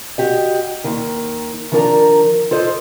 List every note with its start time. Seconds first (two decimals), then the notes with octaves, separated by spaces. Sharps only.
0.18 F#4 G4 D#5
0.84 D#2 D#3
1.72 D#3 F3 D4 A#4 A5 A#5
2.51 F4 A4 C5 D#5